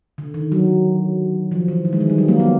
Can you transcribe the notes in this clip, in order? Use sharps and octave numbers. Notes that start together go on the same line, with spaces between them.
D3
D#3
F#3
F3
E3
D#3
G#3
D#3
G3
F#3
A#3
B3